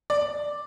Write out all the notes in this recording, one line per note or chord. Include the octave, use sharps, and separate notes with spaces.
D5